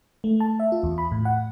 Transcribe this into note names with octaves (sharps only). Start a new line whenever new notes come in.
A3
A5
E5
F4
E2
B5
A2
F#5